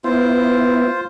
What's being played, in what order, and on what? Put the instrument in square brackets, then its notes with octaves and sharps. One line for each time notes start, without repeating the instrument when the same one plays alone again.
[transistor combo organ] B3 E4 [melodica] F4 C5